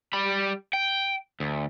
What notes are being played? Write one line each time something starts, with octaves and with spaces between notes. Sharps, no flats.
G3 B5
G5
D2